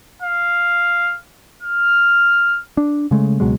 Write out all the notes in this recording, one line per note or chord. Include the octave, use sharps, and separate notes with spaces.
F5
F6
D4
C#3 G#3 A3
C#2 B2 F#3 G#3